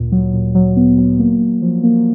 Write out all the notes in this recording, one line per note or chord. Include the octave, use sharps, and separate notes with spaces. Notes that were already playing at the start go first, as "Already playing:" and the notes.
Already playing: D2 A#2
F#3
A#2
F#3
B3
F#3
A#3
A#3
F3
A#3